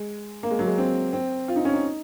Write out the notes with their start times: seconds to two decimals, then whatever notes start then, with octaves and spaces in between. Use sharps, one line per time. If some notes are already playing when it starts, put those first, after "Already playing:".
Already playing: G#3
0.43 A#3
0.51 G#3
0.59 F#3
0.67 G#3
0.78 C4
1.13 C4
1.48 F4
1.56 D#4
1.65 C#4
1.73 D#4